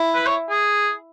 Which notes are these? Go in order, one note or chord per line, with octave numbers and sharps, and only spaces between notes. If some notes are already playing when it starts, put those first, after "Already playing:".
Already playing: E4
B4
C#5
G#4